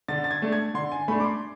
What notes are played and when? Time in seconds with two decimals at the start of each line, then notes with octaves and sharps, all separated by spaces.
0.08 D3 A6
0.24 A6
0.31 G#6
0.42 A3 D4
0.52 G#6
0.74 D3 C6
0.92 G#5
1.08 A3 D4 B5
1.20 D6
1.24 C6